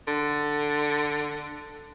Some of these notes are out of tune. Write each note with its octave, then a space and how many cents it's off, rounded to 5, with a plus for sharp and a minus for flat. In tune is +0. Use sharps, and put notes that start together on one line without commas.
D3 +10